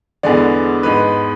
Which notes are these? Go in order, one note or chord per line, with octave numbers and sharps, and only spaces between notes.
E2 D3 G#3 B3 D5
G#2 G#3 B3 B4